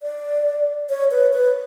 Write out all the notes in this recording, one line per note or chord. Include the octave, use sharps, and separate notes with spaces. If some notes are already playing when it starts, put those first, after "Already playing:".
D5
C#5
B4
B4